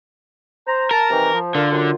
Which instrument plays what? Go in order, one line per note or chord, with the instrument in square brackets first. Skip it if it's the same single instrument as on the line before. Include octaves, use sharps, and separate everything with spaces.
[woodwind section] C5 A#5
[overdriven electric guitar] A#4 [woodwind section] A5
[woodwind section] C3 D#3 E3
F3
[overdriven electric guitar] D3 [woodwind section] D4 F4 A#4
[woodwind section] F#2 F4